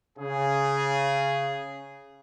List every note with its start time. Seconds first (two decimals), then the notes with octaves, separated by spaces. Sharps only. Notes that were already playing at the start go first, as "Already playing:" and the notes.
0.18 C#3 G#4